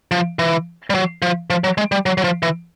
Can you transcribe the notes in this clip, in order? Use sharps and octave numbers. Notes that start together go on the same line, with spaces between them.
F3
E3
G3
F#3
F3
F3
F#3
G#3
G3
F#3
F#3
F3
E3